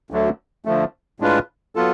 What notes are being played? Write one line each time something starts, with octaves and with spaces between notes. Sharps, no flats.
D2 D3 F#3 A3
D3 F3 A3
A2 G#3 D4 F4 B4
F#3 B3 F4 A4